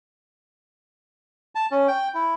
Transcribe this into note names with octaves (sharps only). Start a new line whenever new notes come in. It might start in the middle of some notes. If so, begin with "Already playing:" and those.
A5
C#4
G5
E4